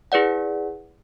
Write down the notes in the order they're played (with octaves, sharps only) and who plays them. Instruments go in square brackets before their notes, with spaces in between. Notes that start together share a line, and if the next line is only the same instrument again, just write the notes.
[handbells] E4 G#4 B4 D5 F#5